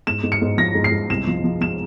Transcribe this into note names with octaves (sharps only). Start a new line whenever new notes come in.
G#2 E7
G#2
C#7
G#2
F3 A#6
G#2
C7
G#2
C2 E7
F3
F3
F3 E7